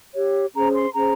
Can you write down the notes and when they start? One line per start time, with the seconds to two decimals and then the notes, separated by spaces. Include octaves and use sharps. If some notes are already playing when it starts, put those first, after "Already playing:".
0.14 G4 C#5
0.54 C#4 G#4 C5 A#5
0.75 C6
0.94 C#4 G#4 C5 A#5